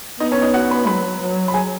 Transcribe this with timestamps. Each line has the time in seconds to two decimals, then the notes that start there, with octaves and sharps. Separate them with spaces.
0.20 B3 D#4 D#5
0.32 C#4 C#5
0.42 D#4 D#5
0.54 F#4 F#5
0.71 B4 B5
0.87 F#3 B4 B5
1.20 F#3
1.48 B5
1.54 G#4 G#5